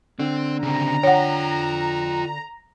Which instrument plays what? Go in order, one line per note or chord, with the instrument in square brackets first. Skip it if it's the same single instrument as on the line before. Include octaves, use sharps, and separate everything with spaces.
[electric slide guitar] D3 [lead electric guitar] C4
[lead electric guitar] C#3 C4 [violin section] A#5
[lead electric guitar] F4 G5 [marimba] C#5 F#5